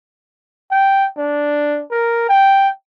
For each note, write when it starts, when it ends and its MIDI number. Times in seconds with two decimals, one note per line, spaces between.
0.71 1.07 79
1.18 1.83 62
1.91 2.26 70
2.29 2.69 79